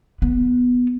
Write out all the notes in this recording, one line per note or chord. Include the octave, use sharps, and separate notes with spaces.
B3